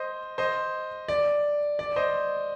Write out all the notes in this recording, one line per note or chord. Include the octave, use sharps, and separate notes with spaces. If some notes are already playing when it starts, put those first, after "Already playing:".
Already playing: C5 D#5
C5 D#5
D5
D5
C5 D#5